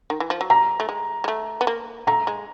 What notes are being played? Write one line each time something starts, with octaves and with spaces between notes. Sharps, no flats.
D#3
E3
F3
F#3
G3 A#5
A3
G#3
G#3
A3
B3
A#3
A3 A#5
G#3